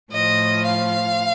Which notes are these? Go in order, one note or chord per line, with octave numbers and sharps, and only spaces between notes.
A2 F3 D#5
F5